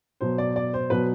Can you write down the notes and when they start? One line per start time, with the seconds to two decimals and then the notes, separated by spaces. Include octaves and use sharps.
0.21 B2 F#3 C5
0.38 D5
0.56 D5
0.74 C5
0.90 B2 F#3 B4